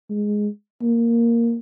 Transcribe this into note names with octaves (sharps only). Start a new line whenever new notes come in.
G#3
A#3